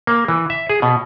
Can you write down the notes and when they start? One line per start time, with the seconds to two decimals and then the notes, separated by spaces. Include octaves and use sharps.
0.07 A#3
0.28 E3
0.50 E5
0.69 G#4
0.82 B2